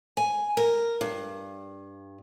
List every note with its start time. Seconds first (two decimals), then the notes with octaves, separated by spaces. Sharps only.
0.17 G#5
0.57 A#4
1.01 G2